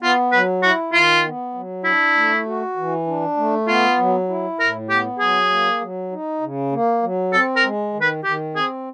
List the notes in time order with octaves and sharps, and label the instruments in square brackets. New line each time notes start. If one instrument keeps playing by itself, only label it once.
[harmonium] B3 [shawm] F4
[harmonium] F#3 [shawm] B4
[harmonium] E4 [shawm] F#4
[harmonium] D#3 [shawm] F4
[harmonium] B3
F#3
[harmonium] D4 [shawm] E4
[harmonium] A3
F#4
E3
D4
A3
[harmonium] B3 [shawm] F4
[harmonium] F#3
E4
[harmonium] A2 [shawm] A#4
[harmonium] B3 [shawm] G4
[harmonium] F#3 [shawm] G#4
[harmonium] A#3
F#3
D#4
C#3
A#3
F#3
[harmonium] C4 [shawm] A4
[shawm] A#4
[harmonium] G#3
D#3
[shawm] B4
[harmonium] D#3 [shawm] G4
[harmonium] C4 [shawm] G#4